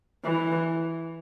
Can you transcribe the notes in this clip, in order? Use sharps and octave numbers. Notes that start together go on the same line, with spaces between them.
E3